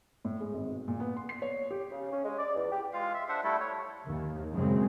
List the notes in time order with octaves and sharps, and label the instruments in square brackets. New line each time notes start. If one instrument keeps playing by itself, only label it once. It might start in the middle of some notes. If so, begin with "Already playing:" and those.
[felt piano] A2
G#3
G#1
B2
A#2
B3
C6
C7
C#5
G4
[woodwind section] C#3
C#4
G#3
D5
E2
G4
[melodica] G#3 F4 F5
E5
D4 C5 E5 F#5
G3 A3 E4 A4
C#5
[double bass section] D#2 D#3
F#2 C#3 G#3 C4